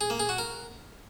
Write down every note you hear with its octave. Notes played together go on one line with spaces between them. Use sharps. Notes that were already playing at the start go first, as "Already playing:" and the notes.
G#4
A#3
G#4
F#4
A#4